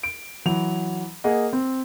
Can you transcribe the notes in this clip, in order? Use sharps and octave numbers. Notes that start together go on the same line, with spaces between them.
D7
E3 F#3 F7
A#3 G#4 D#5 F#5
C4